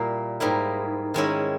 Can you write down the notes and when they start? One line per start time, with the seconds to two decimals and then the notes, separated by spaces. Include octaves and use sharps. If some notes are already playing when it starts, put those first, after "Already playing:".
Already playing: A#2 G3 A#3 E4
0.40 G#2 G3 A#3 E4
1.14 D#3 G#3 C#4 E4